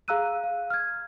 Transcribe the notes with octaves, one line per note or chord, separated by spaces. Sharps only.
G#4 F5 A#5 E6 F#6 D#7
F5
F6 G#6